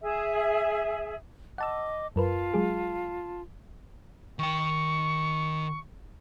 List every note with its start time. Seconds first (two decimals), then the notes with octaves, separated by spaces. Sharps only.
0.02 G#4 E5
1.58 D#5 F#5 A5 D6 E6
2.16 F#2 F4 A#4 B4 A5
2.54 F#3 G#3 G#4
4.39 D#3 G5 C#6